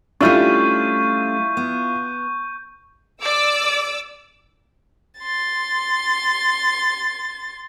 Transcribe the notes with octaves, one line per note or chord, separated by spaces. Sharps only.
G3 A3 C#4 D4 E4 F4 C#6 G6
B3
D5 D6 E6
C6 A6